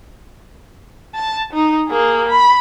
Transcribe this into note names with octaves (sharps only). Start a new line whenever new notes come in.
A5
D#4
A#3 G#4
B5